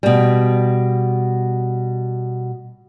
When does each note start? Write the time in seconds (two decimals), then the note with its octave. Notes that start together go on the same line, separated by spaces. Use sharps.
0.03 B2 G3